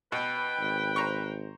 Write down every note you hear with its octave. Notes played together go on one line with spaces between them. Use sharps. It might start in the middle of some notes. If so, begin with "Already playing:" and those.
B2 B4 G5
G#1
C5 A#5 C#6